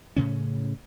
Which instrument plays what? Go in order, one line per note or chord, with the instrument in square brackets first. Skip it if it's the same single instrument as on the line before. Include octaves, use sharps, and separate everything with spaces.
[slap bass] A2 C#3 C#4